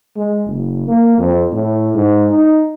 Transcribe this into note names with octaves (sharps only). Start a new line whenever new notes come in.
G#3
F#1
A#3
F2
A2
G#2
D#4